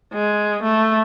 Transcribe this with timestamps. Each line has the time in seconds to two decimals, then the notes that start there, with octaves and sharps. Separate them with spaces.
0.14 G#3
0.64 A3